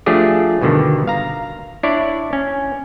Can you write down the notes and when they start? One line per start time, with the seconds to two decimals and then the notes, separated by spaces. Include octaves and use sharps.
0.06 F3 A3 D4 G4 G#4
0.61 G2 B2 D3 D#3
1.07 F5 A#5
1.83 D4 E4 C#5 D5
2.33 C#4